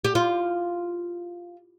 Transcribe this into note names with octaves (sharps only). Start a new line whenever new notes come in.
G4
F4